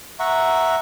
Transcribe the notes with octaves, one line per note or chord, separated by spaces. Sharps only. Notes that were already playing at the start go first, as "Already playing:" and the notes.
E5 F#5 A#5 C#6